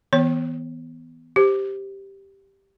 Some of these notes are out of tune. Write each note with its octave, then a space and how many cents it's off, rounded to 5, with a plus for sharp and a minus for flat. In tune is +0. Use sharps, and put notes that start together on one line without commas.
E3 -30 B3 +0 C#5 +0
G4 +0 C5 -5